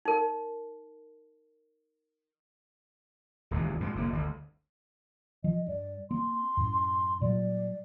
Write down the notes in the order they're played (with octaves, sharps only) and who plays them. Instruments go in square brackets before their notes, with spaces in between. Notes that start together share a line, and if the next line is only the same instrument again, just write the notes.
[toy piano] D#4 A#4
[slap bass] D#1 C#2 A#2 E3
G2 A#2 F3 G#3
F1 D3 A#3
G1 D2
[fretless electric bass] F3 [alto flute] D#5
[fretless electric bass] G2 [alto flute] D5
[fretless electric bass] A#3 C4 [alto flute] C6
[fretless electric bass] F#2 A2
[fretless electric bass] A#2 F#3 G3 [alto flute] D5